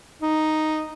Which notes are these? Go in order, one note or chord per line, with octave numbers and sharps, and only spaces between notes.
D#4